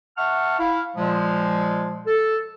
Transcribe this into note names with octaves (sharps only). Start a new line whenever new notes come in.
E5 F#5 A5 C#6 F6
E4 F5
A#2 F3 G#3
A4